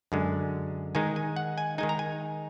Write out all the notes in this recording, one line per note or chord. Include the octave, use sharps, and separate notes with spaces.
F#2 D3 G#3
D#3 G#3 D#4 G#5
G#5
F#5
G#5
D#3 G#3 D#4 G#5
A#5
G#5